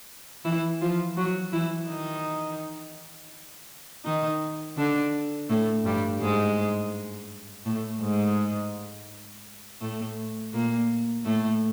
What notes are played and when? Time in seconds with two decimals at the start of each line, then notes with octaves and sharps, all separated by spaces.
0.45 E3 E4
0.81 F3 F4
1.17 F#3 F#4
1.53 E3 E4
1.89 D#3 D#4
4.05 D#3 D#4
4.77 D3 D4
5.50 A2 A3
5.85 G2 G3
6.21 G#2 G#3
7.66 A2 A3
8.01 G#2 G#3
9.81 A2 A3
10.54 A#2 A#3
11.25 A2 A3